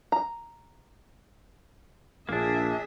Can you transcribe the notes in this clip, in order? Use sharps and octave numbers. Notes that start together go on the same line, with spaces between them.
A#5
A#1 A#3 D4 G#4 E5